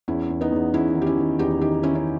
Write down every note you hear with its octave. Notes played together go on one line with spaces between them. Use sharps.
E2 C#4 E4
E2
B3 D#4
E2
E2 C#4 E4
D#3
G4
C#4 E4
D#3
E2 D#4 G4
D#3 D#4 G4
D#3 C#4 E4
C#4